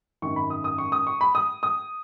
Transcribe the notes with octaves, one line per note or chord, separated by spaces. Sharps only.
G#1 F#2 D#3 C#6
B5
D#6
D#6
C#6
D#6
C#6
B5
D#6
D#6